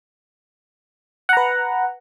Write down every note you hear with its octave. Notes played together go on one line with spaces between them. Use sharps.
B4 F#5 A#5